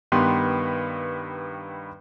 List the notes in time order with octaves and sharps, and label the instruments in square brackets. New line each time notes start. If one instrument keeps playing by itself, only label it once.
[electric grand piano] G2 D#3 B3 G4 B4 C6